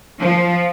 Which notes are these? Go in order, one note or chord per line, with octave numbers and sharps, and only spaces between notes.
F3